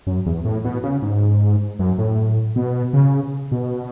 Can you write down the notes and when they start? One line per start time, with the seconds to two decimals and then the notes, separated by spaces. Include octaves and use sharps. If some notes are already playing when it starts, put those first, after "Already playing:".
0.07 F#2
0.26 E2
0.45 A2
0.64 B2
0.83 C#3
1.02 G#2
1.79 F#2
1.98 A2
2.56 B2
2.93 C#3
3.52 B2